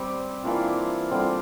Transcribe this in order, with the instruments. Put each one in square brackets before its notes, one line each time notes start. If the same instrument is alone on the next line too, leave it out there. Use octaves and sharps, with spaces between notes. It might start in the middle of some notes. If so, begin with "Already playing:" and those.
Already playing: [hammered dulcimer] G3 C4 G4
E3 A#3 D4 F4
D3 G3 C4 F4